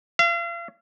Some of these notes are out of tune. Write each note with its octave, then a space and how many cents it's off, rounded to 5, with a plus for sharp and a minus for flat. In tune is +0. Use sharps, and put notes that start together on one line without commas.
F5 -40